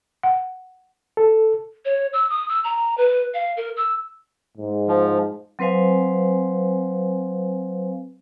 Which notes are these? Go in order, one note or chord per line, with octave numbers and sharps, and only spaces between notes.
F#5
A4
C#5
E6
D#6
E6
A#5
B4
F5
A#4
E6
G#2
F3
F#3 C4 B4 C5 F5 G#5